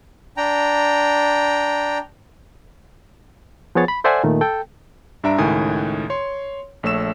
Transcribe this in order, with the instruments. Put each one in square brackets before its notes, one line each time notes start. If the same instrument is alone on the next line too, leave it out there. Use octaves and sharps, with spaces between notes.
[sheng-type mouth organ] D4 G5 A#5
[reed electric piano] F3 B3 G#4 C#5 A6
B5
A4 C5 D5 E5 F#5 G#5
A#2 D#3 A3
A4 G5
[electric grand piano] G2 D4 E5 A#5 D7
C#2 A2 D#3 G#5 D#6
C#5 C6
A#1 A3 C#5 E6 E7